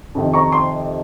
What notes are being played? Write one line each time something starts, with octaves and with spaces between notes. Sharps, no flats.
F2 C3 D#3
A#5 C#6
C6